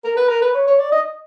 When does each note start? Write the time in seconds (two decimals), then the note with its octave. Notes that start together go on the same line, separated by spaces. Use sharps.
0.04 A#4
0.17 B4
0.29 A#4
0.42 B4
0.55 C#5
0.68 C#5
0.79 D5
0.92 D#5